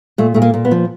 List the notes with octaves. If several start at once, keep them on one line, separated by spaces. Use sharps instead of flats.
A#2 A3
A#2 A3
A#3
A#2
B3
F3